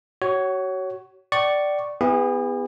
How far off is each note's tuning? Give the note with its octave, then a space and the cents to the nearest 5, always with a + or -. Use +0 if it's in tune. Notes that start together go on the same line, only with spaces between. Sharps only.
F#4 +30 C#5 +0
D5 +0 G5 -45 C#6 +0
B3 +15 E4 +0 G#4 -40